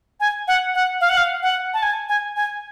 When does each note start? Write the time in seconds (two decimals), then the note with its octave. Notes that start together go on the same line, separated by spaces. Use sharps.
0.20 G#5
0.48 F#5
0.74 F#5
1.01 F5
1.09 F#5
1.17 F5
1.43 F#5
1.74 A5
1.83 G#5
2.09 G#5
2.36 G#5